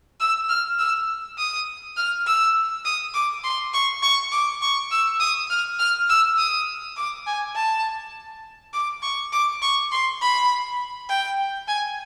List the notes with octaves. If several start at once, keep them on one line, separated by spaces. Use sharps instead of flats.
E6
F6
E6
D#6
F6
E6
D#6
D6
C6
C#6
C#6
D6
C#6
E6
D#6
F6
F6
E6
D#6
D6
G#5
A5
D6
C#6
D6
C#6
C6
B5
G5
G#5